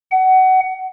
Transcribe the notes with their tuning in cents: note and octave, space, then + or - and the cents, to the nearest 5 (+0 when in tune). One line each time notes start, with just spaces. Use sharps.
F#5 +25